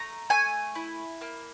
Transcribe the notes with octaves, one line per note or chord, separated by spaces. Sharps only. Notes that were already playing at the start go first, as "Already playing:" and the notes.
Already playing: A3 A#5
A3 G#5
E4
A#3